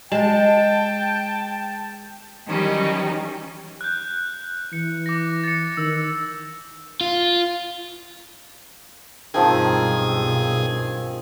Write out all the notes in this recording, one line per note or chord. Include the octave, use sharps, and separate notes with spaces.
G#3 G5 A5
D#3 E3 F#3 G3 C#4 D#4
F#6 G6
E3 C#7
D6 A#6
A6 C#7
D#3 E6
F4
B1 G2 D#3 F3 C4 G#4